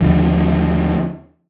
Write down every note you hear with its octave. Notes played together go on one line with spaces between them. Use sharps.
D#2 D3 F3